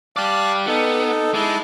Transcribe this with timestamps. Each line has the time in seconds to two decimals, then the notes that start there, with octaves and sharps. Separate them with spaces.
0.16 G4 D5 F5 A5 F#6
0.67 B3 D#4 A4
1.34 G#3 E4 A5 D6